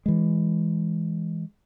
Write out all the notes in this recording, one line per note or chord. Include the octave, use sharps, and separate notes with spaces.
E3 G#3